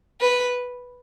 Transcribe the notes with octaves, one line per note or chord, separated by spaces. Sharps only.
B4